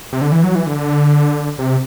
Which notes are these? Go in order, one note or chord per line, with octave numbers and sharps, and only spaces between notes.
C3
D3
E3
F#3
E3
D3
C3